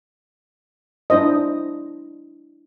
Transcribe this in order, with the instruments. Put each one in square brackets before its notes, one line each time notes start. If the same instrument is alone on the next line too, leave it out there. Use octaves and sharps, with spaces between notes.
[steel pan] D4 E4 C5 D#5